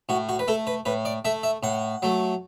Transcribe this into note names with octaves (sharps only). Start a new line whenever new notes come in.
A2 F#4
F#4
B4
A3 A4
B4
A2 B4
D5
A3 E5
E5
A2 F#5
F#3 A3